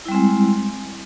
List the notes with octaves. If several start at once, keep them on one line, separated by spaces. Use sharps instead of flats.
G3 G#3 C4 E4